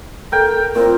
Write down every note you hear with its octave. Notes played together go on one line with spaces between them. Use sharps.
A4 A#4 G5
A#2 C4 A#4